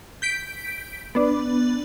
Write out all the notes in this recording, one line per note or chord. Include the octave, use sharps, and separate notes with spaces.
G6 B6 D7
B3 D4